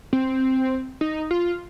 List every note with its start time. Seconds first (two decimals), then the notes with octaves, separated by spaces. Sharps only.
0.13 C4
1.01 D#4
1.31 F4